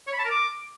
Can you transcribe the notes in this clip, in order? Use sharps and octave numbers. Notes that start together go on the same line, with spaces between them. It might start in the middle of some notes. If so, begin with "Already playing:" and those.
C#5
B5
A5
A#4
D6